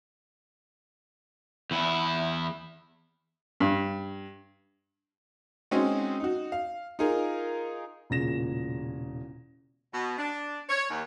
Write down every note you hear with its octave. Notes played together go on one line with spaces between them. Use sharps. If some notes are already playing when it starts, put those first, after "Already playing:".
E2 E4
G2
G#3 C4 C#4 D#4 F#4 G#4
D#4 F#4
F5
D#4 F4 G#4 A#4
E1 A#2 C#3 A#6 E7
B2
D4
C#5
D#2